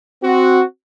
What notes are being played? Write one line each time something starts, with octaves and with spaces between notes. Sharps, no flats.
C4 F#4